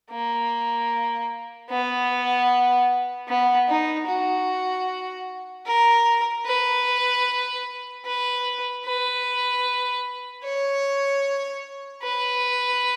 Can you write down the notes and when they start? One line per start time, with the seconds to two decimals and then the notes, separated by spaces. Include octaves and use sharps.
0.11 A#3
1.70 B3
3.28 B3
3.69 D#4
4.08 F#4
5.66 A#4
6.46 B4
8.05 B4
8.85 B4
10.44 C#5
12.02 B4